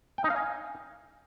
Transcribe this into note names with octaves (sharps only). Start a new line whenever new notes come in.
G5
D#4
F5
G#5